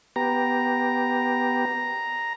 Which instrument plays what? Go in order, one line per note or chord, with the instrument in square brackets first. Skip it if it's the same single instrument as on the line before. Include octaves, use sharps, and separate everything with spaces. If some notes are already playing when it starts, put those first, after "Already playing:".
[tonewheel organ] B3 G4 [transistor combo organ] A#5